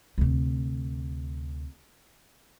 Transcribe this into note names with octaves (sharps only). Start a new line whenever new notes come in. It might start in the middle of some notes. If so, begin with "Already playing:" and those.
D2 C3